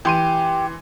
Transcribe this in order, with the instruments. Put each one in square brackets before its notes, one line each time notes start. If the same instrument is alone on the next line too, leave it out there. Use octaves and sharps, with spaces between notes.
[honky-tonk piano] E3 C6 D#7 [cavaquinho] G4